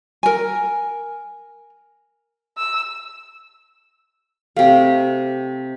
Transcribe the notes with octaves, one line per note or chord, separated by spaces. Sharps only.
A#4 G#5
E6
C3 A3 F5 G5